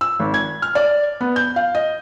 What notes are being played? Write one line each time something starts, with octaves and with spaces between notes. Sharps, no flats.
E6
G#1
G#6
F6
D5
B3
G6
F5
D#5